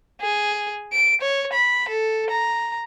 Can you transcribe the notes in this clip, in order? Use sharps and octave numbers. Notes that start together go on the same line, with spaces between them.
G#4
D7
C#5
B5
A4
A#5